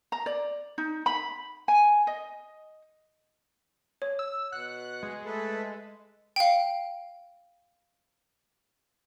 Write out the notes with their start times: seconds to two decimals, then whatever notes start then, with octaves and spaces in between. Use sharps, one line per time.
0.12 A#5
0.26 D5
0.78 D#4
1.06 B5
1.68 G#5
2.07 D#5
4.02 C#5
4.19 E6
4.53 B2 F#5 F#6
5.03 G#3
5.25 A3 A4 B4
6.36 F5 G5